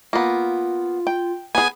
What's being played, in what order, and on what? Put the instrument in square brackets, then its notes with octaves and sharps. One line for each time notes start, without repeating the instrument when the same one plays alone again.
[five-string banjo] A#3 B3 [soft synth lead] F4
[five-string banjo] G5
[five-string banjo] B3 G#4 [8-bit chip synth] G#5